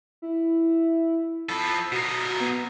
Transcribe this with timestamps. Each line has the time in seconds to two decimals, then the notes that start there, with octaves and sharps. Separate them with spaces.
0.22 E4
1.49 F3 A4 B5
1.92 B2 F#4 A#4
2.40 B3